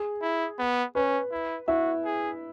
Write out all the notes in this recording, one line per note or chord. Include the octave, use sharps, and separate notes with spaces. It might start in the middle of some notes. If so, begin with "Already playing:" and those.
Already playing: G#4
E4
B3
C#4 B4
E4
E4 F#4 E5
G#4